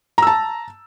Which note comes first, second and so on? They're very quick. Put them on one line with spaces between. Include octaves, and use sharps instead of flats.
A#5 E6 A5